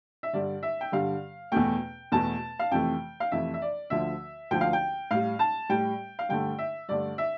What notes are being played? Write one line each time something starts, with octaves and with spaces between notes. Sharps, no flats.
E5
G2 D3 G3 D5
E5
G5
G2 D3 G3 F5
E2 B2 A3 G5
E2 B2 A3 A5
F5
F2 C3 E3 A3 G5
F5
F2 C3 E3 A3 E5
E5
D5
D2 D3 F3 E5
D2 D3 F3 G5
F5
G5
A2 G3 F5
A5
A2 G3 G5
F5
G2 D3 A3 G5
E5
G2 D3 A3 D5
E5